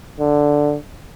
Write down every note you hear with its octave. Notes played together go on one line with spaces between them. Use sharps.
D3